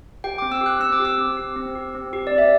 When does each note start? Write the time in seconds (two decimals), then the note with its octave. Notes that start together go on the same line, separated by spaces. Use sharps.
0.24 G4 G5
0.38 C4 D6
0.52 E6
0.61 G4
0.66 F#6
0.80 C4 E6
0.92 D6
1.00 G4
1.05 E6
1.18 C4
1.37 G4
1.56 C4
1.75 G4
1.95 C4
2.13 G4
2.27 C4 D5
2.38 E5